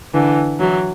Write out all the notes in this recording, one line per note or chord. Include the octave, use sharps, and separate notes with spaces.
D3 E3
E3 F#3